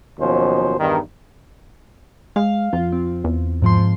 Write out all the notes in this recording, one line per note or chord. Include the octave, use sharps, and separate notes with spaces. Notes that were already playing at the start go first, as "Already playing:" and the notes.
D#2 B2 F3 F#3 C#4 C5
E2 G2 D#3
G#3 F5
F2 F4
C4
E2
G#2 F3 C6